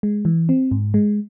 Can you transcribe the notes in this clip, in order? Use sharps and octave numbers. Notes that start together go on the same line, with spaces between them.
G#3
E3
C4
G#2
G#3